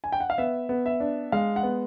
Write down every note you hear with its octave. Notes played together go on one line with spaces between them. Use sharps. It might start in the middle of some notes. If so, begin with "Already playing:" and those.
G#5
G5
F#5
F5
B3 E5
B3
E5
D4
G#3 F5
F#5
B3